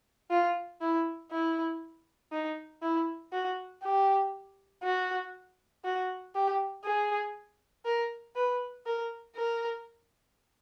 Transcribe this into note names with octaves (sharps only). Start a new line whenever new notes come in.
F4
E4
E4
D#4
E4
F#4
G4
F#4
F#4
G4
G#4
A#4
B4
A#4
A#4